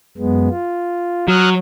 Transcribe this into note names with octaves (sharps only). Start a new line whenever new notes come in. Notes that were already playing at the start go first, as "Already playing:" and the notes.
F#2 G#3 B3
F4
F#3 D#6 F6 F#6